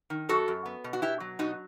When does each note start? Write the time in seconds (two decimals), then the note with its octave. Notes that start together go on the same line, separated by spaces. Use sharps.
0.10 D#3
0.29 F#2 F#4 A4
0.48 F#2
0.66 B3
0.84 B2
0.93 F#4
1.02 B2 E4 G4
1.20 F#3
1.39 B2 D#4 F#4